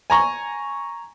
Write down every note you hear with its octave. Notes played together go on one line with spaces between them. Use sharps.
G#5 A#5 C#6